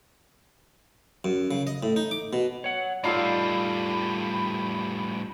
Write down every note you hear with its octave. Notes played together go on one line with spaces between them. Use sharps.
F#2
C#3
D#5
A2
D#4
D6
B2
C#5 F#5
A2 G3 D#4 F4 A4 D5 F5 B5